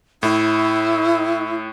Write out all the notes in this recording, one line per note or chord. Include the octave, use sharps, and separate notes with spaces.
A2 E4